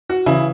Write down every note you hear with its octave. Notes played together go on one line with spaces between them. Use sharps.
F#4
C#3 E3 E4